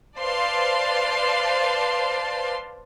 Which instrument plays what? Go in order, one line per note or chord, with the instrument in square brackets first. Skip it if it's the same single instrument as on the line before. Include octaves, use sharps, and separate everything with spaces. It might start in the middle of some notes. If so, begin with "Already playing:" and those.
[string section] B4 C5 D5 F5 A5 C6